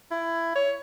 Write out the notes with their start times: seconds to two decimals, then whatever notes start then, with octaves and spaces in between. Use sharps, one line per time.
0.11 E4
0.55 C#5